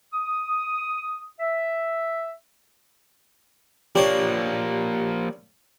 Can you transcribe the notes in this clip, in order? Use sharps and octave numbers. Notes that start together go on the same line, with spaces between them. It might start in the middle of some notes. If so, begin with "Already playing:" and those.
D#6
E5
F3 A#3 D4 G4 C5 C#5